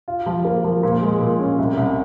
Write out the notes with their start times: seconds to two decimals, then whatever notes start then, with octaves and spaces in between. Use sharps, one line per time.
0.08 F4
0.26 F3
0.45 A#3
0.64 F3
0.83 A#2
1.02 G#3
1.21 A#2
1.39 C#4
1.59 C2
1.77 C2